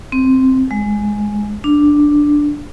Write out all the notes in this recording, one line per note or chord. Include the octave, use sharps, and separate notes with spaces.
C4
G#3
D4